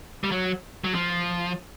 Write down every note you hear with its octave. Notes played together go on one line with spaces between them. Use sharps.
G3
F#3
F#3
F3